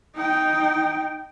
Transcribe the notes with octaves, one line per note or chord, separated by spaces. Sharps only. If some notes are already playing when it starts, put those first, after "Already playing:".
D#4 G5